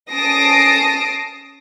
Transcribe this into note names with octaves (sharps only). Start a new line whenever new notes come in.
C#4 A5 D#6 A#6 C7 D7